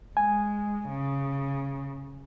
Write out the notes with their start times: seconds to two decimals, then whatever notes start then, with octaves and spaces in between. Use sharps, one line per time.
0.17 G#3 G#5
0.89 C#3